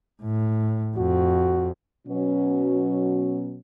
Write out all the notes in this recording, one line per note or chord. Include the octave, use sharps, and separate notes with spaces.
A2
F2 F#4
B2 F#3 C#4